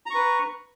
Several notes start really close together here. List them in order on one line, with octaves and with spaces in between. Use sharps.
A#5 C#6 B4